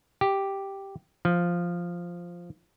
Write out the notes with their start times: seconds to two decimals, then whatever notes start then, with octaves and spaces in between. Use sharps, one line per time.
0.21 G4
1.25 F3